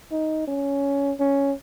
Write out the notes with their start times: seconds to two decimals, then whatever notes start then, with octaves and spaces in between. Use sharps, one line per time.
0.12 D#4
0.48 C#4
1.20 C#4